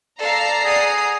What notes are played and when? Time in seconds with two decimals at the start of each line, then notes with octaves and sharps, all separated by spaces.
0.19 A4 D5 F5 A#5 C7
0.64 G#4 F#5 D#6